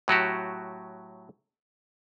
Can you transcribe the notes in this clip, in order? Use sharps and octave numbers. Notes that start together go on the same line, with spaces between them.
A2 F#3 F#4 G4